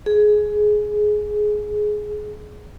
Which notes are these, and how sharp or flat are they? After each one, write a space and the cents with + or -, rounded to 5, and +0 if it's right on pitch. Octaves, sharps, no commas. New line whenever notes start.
G#4 +15